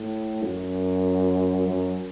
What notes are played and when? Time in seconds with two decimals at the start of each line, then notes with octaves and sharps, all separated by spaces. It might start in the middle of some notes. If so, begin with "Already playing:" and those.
Already playing: A2
0.43 F#2
1.68 F#2